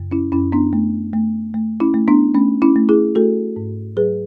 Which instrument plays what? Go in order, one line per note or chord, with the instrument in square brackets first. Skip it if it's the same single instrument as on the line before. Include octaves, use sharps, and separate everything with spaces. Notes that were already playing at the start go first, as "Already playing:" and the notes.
Already playing: [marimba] F#2 C#3
C#4 E4
F#2 C#4 E4
B3 D4
A3
A3
A3
C#4 E4
A3
B3 D4
A3 C#4
C#4 E4
A3
E4 G#4
A3 F#4 A4
G#2
F#3 G#4 B4